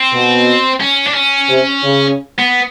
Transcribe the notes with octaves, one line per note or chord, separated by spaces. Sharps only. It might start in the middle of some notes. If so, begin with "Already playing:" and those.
Already playing: C4
B2
C#4
D4
C#4
C3
C#3
B3